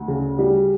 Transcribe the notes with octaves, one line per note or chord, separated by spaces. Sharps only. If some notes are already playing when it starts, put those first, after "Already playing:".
Already playing: D2
C#3
G3